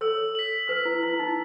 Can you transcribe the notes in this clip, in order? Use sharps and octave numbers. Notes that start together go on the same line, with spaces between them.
A4 C#5 E6
B6 F#7
B4 E6
E4
E4 B6 F#7
D#4